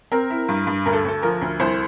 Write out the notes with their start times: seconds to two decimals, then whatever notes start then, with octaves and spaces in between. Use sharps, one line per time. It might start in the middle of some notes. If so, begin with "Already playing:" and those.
0.12 C4 A#4
0.30 E4
0.48 G2
0.67 G2
0.86 D2 A#4
0.93 A4
1.04 D2 A4
1.22 F3 A#4
1.41 D2
1.60 C2 C5